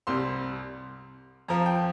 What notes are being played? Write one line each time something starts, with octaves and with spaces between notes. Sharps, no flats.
C2 C3 G3 C6
F2 F3 A#5
G5